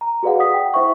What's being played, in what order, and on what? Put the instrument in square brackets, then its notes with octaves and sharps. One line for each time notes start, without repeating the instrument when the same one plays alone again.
[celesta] A#5
F#4 G#4 B4 D5 F5 F#5
D5 F#5 D#6 B6
G5
E4 C5 E5 C#6